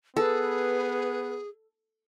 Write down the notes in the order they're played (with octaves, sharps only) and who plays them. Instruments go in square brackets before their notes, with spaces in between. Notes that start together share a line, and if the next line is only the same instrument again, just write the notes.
[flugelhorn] B3 [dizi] G#4 [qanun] A4 [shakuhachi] B4